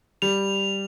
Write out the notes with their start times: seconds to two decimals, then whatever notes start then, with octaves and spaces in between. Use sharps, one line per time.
0.22 G3 F7